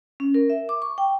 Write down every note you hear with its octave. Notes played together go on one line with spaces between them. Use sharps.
C#4
A#4
E5
D6
C#6
G5